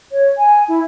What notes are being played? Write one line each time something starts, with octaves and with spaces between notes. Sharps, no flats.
C#5
G#5
E4